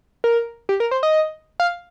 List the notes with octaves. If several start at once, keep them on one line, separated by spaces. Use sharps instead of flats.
A#4
G4
A#4
C5
D#5
F5